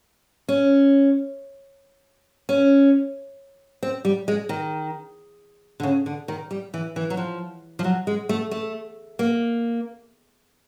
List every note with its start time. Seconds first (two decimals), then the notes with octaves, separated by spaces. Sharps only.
0.48 C#4
2.49 C#4
3.83 C4
4.05 G3
4.28 G#3
4.49 D#3
5.80 D3
5.83 C#3
6.06 D3
6.28 D#3
6.51 G3
6.74 E3
6.96 E3
7.10 F#3
7.17 F3
7.79 F3
7.84 F#3
8.07 G#3
8.29 A3
8.51 A3
9.19 A#3